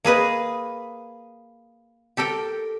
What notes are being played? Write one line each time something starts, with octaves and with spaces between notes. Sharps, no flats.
A#3 G#4 B4 D#5
G4 A4 A#4 G5